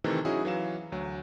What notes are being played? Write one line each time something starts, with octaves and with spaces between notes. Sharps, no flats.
C3 D#3 E3 A3 A4
F#3 C#4 D#4 E4 F#4 G#4
E3 F#3 F5 E7
D2 F#3